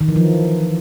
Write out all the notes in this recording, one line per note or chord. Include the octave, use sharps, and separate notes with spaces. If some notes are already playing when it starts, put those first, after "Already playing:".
D#3
E3
F3